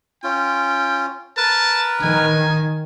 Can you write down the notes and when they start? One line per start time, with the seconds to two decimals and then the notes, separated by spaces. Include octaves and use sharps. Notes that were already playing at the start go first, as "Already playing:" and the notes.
0.24 C#4 F4 G5
1.37 A#4 B4 A5
2.02 D#3 G#5